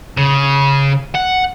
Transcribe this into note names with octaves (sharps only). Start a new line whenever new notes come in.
C#3
F#5